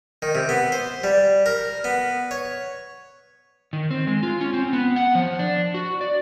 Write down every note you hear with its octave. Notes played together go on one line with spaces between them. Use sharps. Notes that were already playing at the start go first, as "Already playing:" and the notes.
D#3
C3
B3
C5
G3
A#4
B3
C#5
D#3
C4
G#3
F4
C#4
C4
B3
F#5
F3
D4
F#4
D5